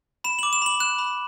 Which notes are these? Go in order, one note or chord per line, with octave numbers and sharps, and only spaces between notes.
B5 E7
D6 F#7
E7
B5 F#7
F#6 E7
B5